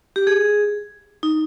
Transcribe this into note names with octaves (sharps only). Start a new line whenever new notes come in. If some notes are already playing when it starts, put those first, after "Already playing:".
G4
G#4
D#4